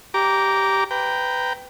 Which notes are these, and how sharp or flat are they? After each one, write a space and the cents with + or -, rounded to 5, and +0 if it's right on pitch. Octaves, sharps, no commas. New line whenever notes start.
G4 +0 A#5 +0 D6 -20
B4 +20 G5 +0 A#5 +0